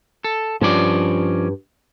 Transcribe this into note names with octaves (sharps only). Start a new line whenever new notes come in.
A4
G2 F3 C#4 D5